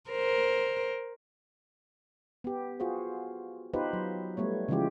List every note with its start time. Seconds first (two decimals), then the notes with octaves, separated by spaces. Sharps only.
0.10 A#4 C5
2.44 B3 G4
2.80 F4 F#4 G#4 C5
3.74 B3 D#4 F4 G4 B4 C5
3.93 F#3
4.37 G3 A3 B3 C#5
4.68 C#3 E3 F3 G#3 F4 G4